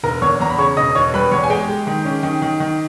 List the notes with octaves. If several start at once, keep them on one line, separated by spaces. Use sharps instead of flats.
E1 A#4 A#5
E2 C#5 C#6
E2 A#5
B5
C#3 C#5 C#6
E1 D#5 D#6
E1 C#5 C#6
G3 B4 B5
E2 C#5 C#6
G#5
G#3 G4 G5
G#3
D#3
C#4
D#3
D#3
D#3